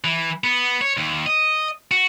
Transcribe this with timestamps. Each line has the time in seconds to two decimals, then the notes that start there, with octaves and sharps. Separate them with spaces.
0.04 E3
0.44 B3
0.82 C#5
0.97 D#2
1.26 D#5
1.91 F#4